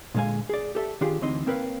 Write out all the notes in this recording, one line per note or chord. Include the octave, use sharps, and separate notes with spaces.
A#2 D3 G#3 F5 G#5
G#4 D5
G4 A4 E5
D#3 D4 F4 G4 G#4
D2 E3 C4 D#4 D#5 C6
A#3 C4 A#4 B4 C#5 F5